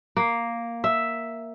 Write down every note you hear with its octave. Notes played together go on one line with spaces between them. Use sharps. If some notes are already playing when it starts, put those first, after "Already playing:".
A#3
E5